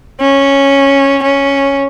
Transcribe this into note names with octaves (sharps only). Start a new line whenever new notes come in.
C#4
C#4